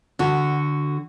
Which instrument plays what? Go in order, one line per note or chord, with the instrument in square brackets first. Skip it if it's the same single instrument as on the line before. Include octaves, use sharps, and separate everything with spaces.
[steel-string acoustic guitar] D3 F#4